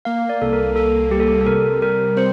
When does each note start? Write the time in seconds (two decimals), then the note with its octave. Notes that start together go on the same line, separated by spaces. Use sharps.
0.05 A#3 F5
0.29 D5
0.42 C2 A4
0.53 A#4
0.76 A#3 A4
1.11 G3 G4
1.20 A4
1.28 G4
1.41 A4
1.47 C3 A#4
1.82 C3 A#4
2.16 C4 C5